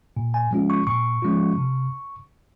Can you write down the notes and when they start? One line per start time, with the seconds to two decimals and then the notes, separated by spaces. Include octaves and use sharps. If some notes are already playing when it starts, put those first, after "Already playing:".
0.17 A#2
0.34 G#5
0.51 F3 G#3 C#4 F4
0.70 C#6
0.87 A#2 C#6
1.22 F3 G#3 C#4 F4
1.58 C3